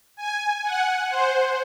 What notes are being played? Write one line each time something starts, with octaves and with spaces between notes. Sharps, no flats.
G#5
F#5
C5